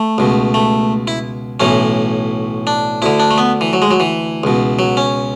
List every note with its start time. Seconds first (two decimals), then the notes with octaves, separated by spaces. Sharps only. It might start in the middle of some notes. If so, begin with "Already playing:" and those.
Already playing: A3
0.18 C#2 B2
0.54 A3
1.07 E4
1.60 B1 A2 E3 C#4
2.67 D4
3.02 D2 D3 E4
3.20 D4
3.31 A3
3.38 B3
3.61 E3
3.73 F#3
3.82 G#3
3.91 F#3
4.00 E3
4.44 C#2 B2
4.79 F#3
4.97 C#4